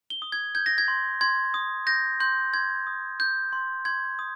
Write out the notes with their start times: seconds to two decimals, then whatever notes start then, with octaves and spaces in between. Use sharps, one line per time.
0.10 G7
0.22 D#6
0.32 G#6
0.55 G6 G#6
0.66 A#6
0.78 G#6
0.88 C6
1.21 C6 G#6
1.54 D#6
1.87 G6 A#6
2.20 C6 G6
2.53 C6 G#6
2.87 D#6
3.20 G6
3.53 C6
3.85 C6 G#6
4.19 D#6